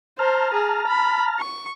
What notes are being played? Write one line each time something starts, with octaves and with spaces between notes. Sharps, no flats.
C5 A5 A#5 F6
G#4
B5
C#6